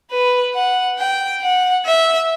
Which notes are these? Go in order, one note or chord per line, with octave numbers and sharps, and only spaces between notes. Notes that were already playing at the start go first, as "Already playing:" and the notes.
B4
F#5
G5
F#5
E5